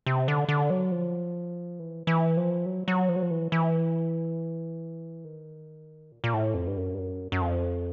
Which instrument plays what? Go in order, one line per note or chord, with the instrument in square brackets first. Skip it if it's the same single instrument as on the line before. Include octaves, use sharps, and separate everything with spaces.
[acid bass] C3
D3
D3
F#3
F3
E3
E3
F3
F#3
F#3
F3
F#3
F3
E3
E3
D#3
A#2
A#2
A2
F2
G2
F#2
G2
F#2
F#2
F2